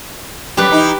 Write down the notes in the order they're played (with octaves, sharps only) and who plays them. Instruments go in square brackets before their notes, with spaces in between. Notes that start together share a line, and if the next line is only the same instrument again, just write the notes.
[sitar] F#2 G3 [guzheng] G4 B4
[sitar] E3 D#4